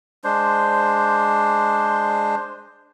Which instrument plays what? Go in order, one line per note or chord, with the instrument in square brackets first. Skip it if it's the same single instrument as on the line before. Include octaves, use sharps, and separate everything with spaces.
[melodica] G#3 D4 C5